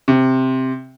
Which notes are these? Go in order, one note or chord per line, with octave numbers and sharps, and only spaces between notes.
C3